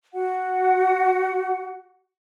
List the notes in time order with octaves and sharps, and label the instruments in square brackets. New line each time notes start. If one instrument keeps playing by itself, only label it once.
[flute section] F#4 F#5